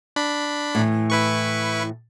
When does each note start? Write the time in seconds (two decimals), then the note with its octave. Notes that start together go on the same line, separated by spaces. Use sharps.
0.16 D4 B5
0.75 A2 E3
1.10 E4 B4 C#6